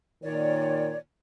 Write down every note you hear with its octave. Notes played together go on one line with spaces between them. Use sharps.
A#2 D#3 C#5 D5